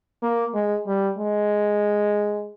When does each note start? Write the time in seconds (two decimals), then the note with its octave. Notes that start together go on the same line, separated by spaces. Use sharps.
0.23 A#3
0.54 G#3
0.87 G3
1.18 G#3